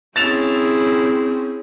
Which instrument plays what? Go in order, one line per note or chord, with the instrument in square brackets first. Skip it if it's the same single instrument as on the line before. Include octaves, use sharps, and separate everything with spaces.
[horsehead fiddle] C4 C#4 [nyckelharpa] E4 G#4 [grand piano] A6 E7 F7